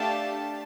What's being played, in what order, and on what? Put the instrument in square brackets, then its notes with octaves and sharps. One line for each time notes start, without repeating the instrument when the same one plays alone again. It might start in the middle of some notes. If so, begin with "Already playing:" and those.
Already playing: [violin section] A3 D4 G4 F5 A5